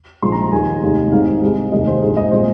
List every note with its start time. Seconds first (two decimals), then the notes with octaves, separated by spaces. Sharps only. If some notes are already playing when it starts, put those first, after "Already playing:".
0.22 A#1 G#2 F3 G#3 C6
0.32 A#5
0.42 A#5
0.52 D#2 D#3 G#3 G#5
0.82 F1 D#2 D#3 G#3
1.12 G#1 G#2 D#3 F5
1.42 C2 C3 G#3
1.72 F1 D#2 D#3 G#3 D#5
1.87 C5
2.02 A#1 G#2 G#3
2.17 D#5
2.31 A#2 G#3 C5